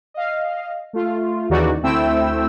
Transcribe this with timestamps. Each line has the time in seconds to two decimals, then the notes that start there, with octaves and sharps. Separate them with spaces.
0.14 D#5 F5
0.93 A3 F4
1.49 D#2 C#3 E3 D#4 F#4 D5
1.83 D2 A3 C4 E4 G5 E6